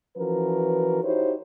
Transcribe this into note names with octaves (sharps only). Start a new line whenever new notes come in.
E3 F3 C#4 F#4 A#4 B4
D#4 E4 F#4 G4 C5 C#5